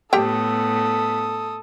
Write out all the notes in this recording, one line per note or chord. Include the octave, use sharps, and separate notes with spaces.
A2 B3 G4 A4 G5 D#6